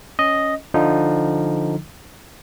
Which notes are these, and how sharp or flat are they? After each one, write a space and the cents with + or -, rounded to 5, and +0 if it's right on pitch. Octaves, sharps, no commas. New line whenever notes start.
C#4 +0 D#5 +0
D3 +0 F3 +0 D#4 +0